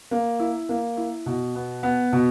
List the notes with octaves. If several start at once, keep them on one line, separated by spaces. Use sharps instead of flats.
A#3
E4
A#3
E4
B2
B3
B3
B2